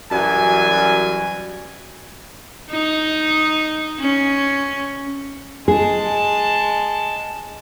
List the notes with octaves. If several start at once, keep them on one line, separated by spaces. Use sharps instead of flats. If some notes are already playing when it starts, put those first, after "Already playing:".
F#2 E3 G3 F#4 G#5
D#4
C#4
G#3 G#4 A5